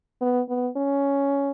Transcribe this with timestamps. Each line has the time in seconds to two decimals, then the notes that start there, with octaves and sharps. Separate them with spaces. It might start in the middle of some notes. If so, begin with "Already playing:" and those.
0.21 B3
0.49 B3
0.77 C#4